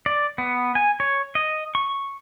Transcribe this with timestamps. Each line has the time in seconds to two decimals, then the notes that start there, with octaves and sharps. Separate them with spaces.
0.06 D5
0.38 B3
0.75 G#5
1.00 C#5
1.35 D#5
1.75 C#6